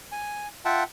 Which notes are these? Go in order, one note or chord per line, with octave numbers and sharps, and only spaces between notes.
G#5
F4 E5 F#5 G5 A5